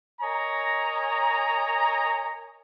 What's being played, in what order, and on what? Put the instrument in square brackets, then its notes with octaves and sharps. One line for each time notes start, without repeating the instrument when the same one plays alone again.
[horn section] A#4 C#5 D#5 G#5 A#5